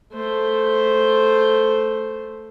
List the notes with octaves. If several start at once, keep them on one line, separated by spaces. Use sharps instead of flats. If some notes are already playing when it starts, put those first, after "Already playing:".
A3 C5